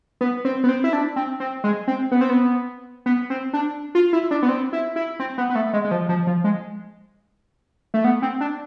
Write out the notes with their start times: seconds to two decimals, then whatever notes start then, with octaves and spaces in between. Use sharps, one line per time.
0.21 B3
0.45 C4
0.64 B3
0.69 C4
0.84 E4
0.93 D4
1.16 C4
1.40 C4
1.64 G#3
1.88 C4
2.11 B3
2.21 C4
2.30 B3
3.06 B3
3.30 C4
3.53 D4
3.95 F4
4.13 E4
4.31 D4
4.43 B3
4.49 C4
4.73 E4
4.96 E4
5.20 C4
5.38 B3
5.50 B3
5.55 A3
5.73 G#3
5.85 G#3
5.91 F3
6.09 F3
6.27 F3
6.44 G#3
7.94 A3
8.04 B3
8.22 C4
8.41 D4